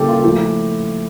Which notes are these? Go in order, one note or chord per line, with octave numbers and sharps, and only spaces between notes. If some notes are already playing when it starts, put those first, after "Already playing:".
Already playing: C#3 G3 A#3 E4 G4 A4
F4
F3 A3 E4 G4